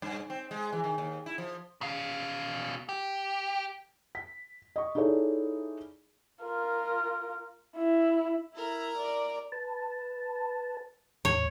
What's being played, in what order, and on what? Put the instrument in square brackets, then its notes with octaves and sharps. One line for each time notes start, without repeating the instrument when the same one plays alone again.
[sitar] G2
C4
G#3
E3
D#3
D#2
E4
F3
[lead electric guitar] B2 F5
G4
[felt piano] B6
D#5 C#6
D#4 E4 G#4 A4 C#5 D5
[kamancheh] F4 A#4
E4
[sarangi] E4 [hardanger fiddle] A#4 A#5
[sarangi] D5
[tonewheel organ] B4 A5
[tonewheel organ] E2 A2 [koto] C#5